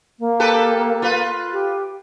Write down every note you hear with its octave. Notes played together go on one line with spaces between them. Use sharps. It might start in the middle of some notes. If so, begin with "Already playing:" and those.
A#3
G4 A4 B4
F4 B4
G4